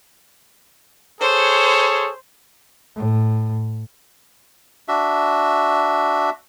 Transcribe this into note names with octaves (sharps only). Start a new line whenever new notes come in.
G#4 A4 C5 C#5
A2
D4 F#4 E5